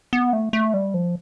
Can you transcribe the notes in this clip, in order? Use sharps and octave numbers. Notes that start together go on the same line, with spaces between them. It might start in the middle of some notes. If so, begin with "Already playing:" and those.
B3
A3
A3
G3
F3